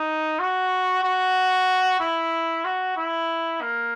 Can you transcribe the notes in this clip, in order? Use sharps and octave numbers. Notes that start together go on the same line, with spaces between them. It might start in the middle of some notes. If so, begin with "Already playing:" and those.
Already playing: D#4
F#4
F#4
E4
F#4
E4
A#3